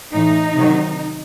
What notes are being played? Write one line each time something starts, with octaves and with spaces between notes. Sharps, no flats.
A2 E3 D#4
C3 D#3 F#3